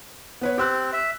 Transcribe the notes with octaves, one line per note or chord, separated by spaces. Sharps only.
B3 B4 C#5
C4 G4 E6 F#6
E5